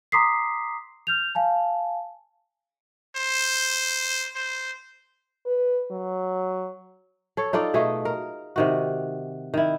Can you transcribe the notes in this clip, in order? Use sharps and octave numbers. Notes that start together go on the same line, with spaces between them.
A#5 C6 D6 D#6 B6 C7
F6 G6 F7
F5 G#5 A5
C5
C5
B4
F#3
A4 C#5
D#4 F4 A4 D5
B2 A3 G#4 D#5
A#4
C3 D#3 F#4
D#3 E4